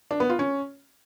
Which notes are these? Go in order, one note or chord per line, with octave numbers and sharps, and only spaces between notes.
D4
B3
F4
C#4